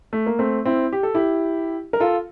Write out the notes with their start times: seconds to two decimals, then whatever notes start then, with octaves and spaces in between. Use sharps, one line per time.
0.13 A3
0.26 A#3
0.39 A3 C4
0.65 C4 E4
0.92 G4
1.03 A4
1.14 E4 G4
1.93 A#4
2.00 F4 A4